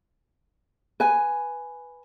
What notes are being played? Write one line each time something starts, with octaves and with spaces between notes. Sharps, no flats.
B4 G#5